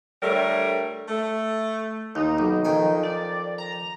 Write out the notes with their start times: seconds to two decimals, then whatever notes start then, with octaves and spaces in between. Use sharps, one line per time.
0.22 D3 G3 A3 A#4 C#5
1.09 A3
2.15 D#2 D#4
2.38 B1
2.65 F2 D#3 G#5
3.03 D5
3.58 A#5